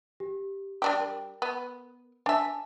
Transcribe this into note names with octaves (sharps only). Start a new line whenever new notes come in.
G4
G3 D4 G4
A#4
B3
D4 E5 G#5 A5